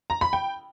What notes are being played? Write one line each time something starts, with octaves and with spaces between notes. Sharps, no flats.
A#5
B5
G5